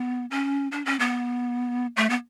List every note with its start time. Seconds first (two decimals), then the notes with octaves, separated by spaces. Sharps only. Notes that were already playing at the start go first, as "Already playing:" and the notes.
Already playing: B3
0.31 C#4
0.72 D4
0.85 C#4
0.99 B3
1.97 A3
2.10 B3